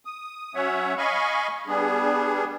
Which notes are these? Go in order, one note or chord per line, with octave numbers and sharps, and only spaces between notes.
D#6
F#3 C#4 C#5 E5 F#5
D#5 F5 G#5 B5 C#6
G3 B3 D4 G#4